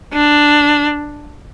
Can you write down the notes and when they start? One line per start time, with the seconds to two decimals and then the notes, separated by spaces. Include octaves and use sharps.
0.13 D4